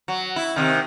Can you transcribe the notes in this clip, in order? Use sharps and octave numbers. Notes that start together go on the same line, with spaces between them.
F#3
E4
C3 D#3